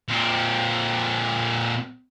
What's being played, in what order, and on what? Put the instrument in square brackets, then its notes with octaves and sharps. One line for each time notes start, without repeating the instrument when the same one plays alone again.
[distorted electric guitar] A#2 C4